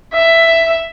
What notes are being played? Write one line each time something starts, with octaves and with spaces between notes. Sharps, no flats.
E5